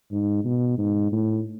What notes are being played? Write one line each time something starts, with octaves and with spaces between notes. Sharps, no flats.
G#2
B2
G#2
A2